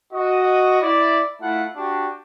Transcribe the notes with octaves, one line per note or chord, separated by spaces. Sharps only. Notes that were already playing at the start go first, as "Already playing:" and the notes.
F#4 D#5
E4 D5
A3 E4 F4 F#5
D4 F#4 G4